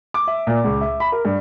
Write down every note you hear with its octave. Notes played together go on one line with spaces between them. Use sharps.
D6
E5
A#2
C#2
E5
B5
A#4
G2